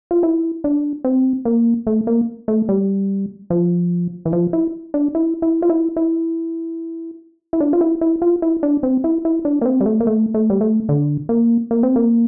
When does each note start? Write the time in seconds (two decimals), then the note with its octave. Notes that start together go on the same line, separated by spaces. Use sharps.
0.11 F4
0.23 E4
0.64 D4
1.05 C4
1.45 A#3
1.87 A3
2.07 A#3
2.48 A3
2.69 G3
3.50 F3
4.25 E3
4.33 F3
4.53 E4
4.94 D4
5.15 E4
5.42 E4
5.62 F4
5.70 E4
5.96 E4
7.53 E4
7.60 D4
7.73 F4
7.81 E4
8.01 E4
8.22 F4
8.42 E4
8.63 D4
8.83 C4
9.04 E4
9.25 E4
9.45 D4
9.61 A#3
9.66 C4
9.81 G3
9.86 A3
10.00 A#3
10.07 A3
10.34 A3
10.50 G3
10.61 A3
10.89 D3
11.29 A#3
11.71 A#3
11.83 C4
11.96 A#3